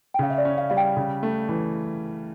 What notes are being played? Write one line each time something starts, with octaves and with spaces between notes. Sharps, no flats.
G5
C#3 F5
E5
D5
C#4
F5
G3 F5
G5
C#3
A3
E3